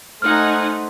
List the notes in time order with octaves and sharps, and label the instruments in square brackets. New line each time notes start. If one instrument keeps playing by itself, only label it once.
[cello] A3 C5 [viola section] D#4 F#5 G#5 [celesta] F6